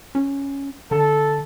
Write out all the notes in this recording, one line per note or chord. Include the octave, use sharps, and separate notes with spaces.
C#4
D3 A4